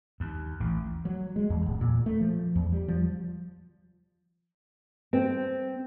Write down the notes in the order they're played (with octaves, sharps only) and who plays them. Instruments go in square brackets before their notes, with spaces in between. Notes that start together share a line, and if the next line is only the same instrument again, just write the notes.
[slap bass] D#2
A1
[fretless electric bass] F#3
G#3
E2
D1
A#2
A3
F3
E2
G3
F3
[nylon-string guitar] C4